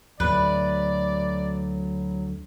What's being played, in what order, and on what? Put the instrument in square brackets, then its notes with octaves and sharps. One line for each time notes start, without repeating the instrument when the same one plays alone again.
[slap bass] D2 A2 [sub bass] F#3 [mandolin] B4 [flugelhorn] D5